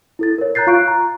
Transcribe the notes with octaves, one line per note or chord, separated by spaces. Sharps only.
E4 A4 A6
A#4 C#5
A#5 F#6 G6 A6 C7
F4 F5 C#6 F#6 D7
A#5